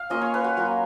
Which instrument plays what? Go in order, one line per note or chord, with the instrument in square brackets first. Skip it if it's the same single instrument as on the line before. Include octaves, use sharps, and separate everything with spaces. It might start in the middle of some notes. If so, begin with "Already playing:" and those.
Already playing: [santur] F5
A#3 C#4 F4 D#5
C#5
B4
F#4
F#3 A#3 F4